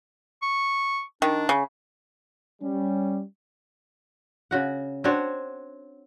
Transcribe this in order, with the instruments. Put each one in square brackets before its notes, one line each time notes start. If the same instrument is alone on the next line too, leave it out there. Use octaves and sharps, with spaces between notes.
[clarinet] C#6
[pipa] D#3 [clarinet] D4
[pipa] C#3
[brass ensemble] G3 C#4
[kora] C#3 F#4 F#5
C4 D4 F#4 C#5